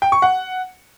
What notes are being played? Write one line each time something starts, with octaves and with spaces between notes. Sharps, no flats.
G5
C#6
F#5